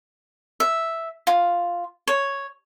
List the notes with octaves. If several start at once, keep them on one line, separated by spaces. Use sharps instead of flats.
E5
F4
C#5